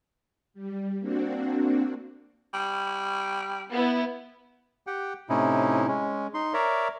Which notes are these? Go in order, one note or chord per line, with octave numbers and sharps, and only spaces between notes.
G3
A#3 C4 D4 F#4
G3
B3 E4
G4 F#5 G5
A2 C3 C#4 D#4 E4
G#3 C#4
D#4 C6
A#4 C#5 D5 E5 A#5